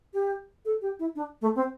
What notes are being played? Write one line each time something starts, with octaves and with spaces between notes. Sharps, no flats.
G4
A4
G4
E4
D4
A3
C4